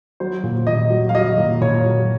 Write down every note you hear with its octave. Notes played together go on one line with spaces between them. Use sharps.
F#3 C5
A#2
A#2 D#5
F#3
F5
F#3 D#5
A#2
A#2 C#5
F#3